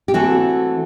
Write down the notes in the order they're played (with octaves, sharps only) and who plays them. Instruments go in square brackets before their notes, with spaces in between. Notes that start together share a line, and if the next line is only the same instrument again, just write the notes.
[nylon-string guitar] G4
E3 A3 C4 F#4 A4